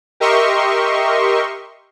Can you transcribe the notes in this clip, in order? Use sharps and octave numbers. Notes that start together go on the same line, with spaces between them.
G4 A#4 D#5 E5 C6 C#6